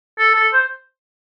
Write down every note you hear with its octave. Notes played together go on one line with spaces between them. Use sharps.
A4
A4
C5